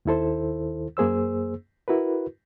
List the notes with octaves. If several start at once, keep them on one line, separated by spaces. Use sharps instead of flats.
D#2 D#3 E4 A4 C5
F#2 A#3 G#4 C5 E6
E4 F#4 A#4 B4